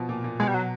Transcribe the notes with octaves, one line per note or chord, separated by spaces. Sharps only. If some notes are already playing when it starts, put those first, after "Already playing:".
Already playing: B2 F3
A#2
A#2
B2 G#3
G3
F#3